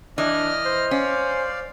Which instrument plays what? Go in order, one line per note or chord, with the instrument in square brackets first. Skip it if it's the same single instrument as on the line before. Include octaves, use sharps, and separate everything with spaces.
[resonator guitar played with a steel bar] E3 [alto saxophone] D4 [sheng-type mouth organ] D#5 F6
[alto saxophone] C5
[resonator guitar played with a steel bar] C#4 [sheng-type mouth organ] D5 F5